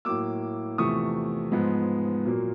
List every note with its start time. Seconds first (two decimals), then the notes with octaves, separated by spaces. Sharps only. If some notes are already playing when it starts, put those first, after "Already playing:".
0.05 A2 F#3 A#3 D6 E6
0.78 E2 C3 F3 A3 C#6 D#6
1.52 G#2 F3 G#3 B3
2.25 A#2 F#3 A#3